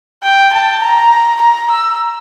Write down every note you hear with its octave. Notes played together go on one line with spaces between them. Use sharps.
G5
A5
A#5
A#5
E6